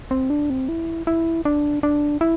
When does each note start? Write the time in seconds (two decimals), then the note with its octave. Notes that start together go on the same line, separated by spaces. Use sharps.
0.11 C4
0.30 D4
0.50 C4
0.69 E4
1.07 E4
1.45 D4
1.83 D4
2.21 E4